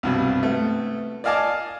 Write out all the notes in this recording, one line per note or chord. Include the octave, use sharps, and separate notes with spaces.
C2 G2 B2
A3 B3
D5 D#5 F5 G#5 A5 D6